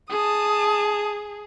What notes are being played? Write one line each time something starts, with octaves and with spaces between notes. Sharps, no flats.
G#4 A5 D#6